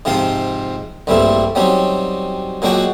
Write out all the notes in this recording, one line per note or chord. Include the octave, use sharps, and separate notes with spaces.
G#2 C3 F3 C4 F4 C6
A#1 G2 G3 A3 C4 E4
F#3 G3 C4 C#4 D#4
A#2 F#3 G#3 D4 F#4 G5